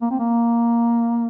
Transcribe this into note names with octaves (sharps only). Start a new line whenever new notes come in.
A#3
C4
A#3